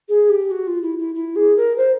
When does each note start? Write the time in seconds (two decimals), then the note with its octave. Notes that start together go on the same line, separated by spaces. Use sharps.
0.09 G#4
0.29 G4
0.51 F#4
0.67 F4
0.82 E4
0.98 E4
1.15 E4
1.36 G#4
1.57 A#4
1.77 C5